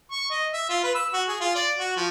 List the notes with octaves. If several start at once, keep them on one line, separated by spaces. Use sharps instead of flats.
C#6
D#5
E5
F4
B4
E6
F#4
G#4
F4
D5
F#4
F3